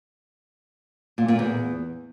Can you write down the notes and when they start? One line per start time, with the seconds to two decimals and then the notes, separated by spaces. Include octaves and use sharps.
1.18 A#2
1.28 A#2
1.39 E2